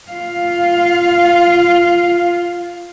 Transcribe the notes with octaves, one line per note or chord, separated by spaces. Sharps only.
F4 F5